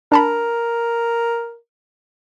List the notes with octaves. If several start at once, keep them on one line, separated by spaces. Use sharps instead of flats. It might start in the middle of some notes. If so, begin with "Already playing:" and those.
D4 A#4 A5 B5